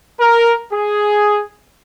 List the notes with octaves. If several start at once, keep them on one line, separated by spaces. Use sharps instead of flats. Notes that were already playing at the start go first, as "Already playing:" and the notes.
A#4
G#4